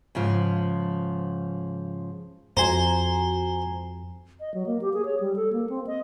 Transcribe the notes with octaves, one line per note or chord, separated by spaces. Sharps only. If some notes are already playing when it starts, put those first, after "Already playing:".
G#2 C#3 F3
F2 F#4 C5 G#5 A#5
D#5
F#3
A#3
G4
G#4
C#5
G3
A4
A#3
C4
D#5